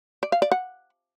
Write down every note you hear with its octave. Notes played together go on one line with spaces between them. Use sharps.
D5
F5
D5
F#5